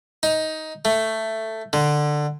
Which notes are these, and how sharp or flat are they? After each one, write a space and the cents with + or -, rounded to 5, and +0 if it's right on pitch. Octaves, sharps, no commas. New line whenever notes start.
D#4 +15
A3 +10
D3 +15